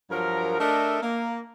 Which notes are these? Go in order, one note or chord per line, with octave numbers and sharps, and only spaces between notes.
G2 F3 F#3 A#4
A3 D4 A4 A#4 D#5 E5
A#3